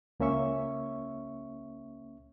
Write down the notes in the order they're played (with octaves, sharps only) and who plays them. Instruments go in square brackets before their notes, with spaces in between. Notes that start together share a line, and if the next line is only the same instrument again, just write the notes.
[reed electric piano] C#2 A#3 C#4 E5 C#6